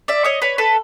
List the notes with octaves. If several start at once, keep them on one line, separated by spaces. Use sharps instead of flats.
D5 E5
C#5 D#5
B4 C#5
A4 B4